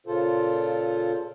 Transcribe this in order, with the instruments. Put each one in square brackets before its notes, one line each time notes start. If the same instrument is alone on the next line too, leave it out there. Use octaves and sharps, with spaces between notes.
[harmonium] A#2 C#3 F4 A4 C5